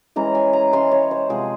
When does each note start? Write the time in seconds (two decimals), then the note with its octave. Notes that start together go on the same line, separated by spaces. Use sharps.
0.16 E3 G#3 C#4 A#5
0.35 G#5
0.53 A#5
0.73 E3 G#3 C#4 C6
0.91 C#5
1.11 C5
1.29 C3 F3 G#3 C4 G#4